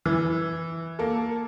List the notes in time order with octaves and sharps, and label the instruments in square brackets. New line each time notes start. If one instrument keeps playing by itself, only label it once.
[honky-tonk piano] E3
A#3 A4